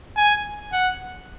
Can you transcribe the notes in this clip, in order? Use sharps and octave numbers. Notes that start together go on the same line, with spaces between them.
G#5
F#5